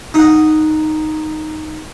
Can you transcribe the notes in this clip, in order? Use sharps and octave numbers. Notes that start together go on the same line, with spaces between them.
D#4 F#5